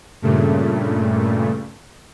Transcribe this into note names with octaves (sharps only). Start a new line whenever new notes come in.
G2 A#2 C#3 A3